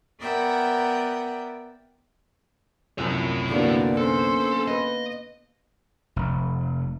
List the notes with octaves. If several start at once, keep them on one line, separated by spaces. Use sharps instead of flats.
B3 A#4 D5 E5 F#5 G5
C2 F#2 F3 E4 C#5
D3 A#3 B3 F#4 D5
C#4 A4 C5
B4 D#5
F1